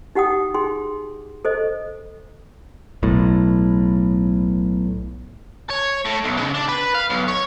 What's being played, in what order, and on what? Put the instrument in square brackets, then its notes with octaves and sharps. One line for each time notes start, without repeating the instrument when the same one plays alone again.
[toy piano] D#4 G4 F#5 G5 D#6
D#4 G#4 G5 C6
A4 C5 D#5
[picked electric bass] B1 A2
[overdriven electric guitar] C#5
A2
B1
C#3
D4
B4
F5
B1
C#5